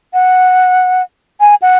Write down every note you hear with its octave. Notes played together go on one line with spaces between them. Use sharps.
F#5
G#5
F#5